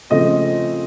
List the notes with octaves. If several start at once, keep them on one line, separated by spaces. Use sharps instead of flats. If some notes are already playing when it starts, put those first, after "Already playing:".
C#3 F3 A3 C4 D#5